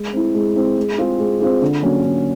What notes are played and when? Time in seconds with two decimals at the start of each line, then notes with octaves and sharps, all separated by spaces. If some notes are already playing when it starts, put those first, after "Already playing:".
Already playing: G#3
0.13 C4 E4
0.34 G#3
0.56 C4 E4
0.77 G#3
0.98 C4 F4 G#4
1.19 G#3
1.40 C4 F4 G#4
1.62 D3
1.83 F#3 A#3 C#4
2.04 D3